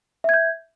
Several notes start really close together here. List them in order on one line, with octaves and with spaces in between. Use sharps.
E5 G#6 G6